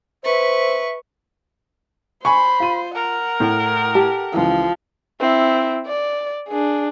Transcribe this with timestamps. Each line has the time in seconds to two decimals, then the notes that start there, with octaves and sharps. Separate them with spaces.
0.24 B4 C5 E5 C#6
2.25 C5 G#5 B5 C#6
2.60 F4 D#7
2.96 A#4 F#5
3.40 A2
3.95 G4 A4 A5
4.34 C#2 E3 F3
5.20 C4 E4
5.87 D5
6.48 D4 G#4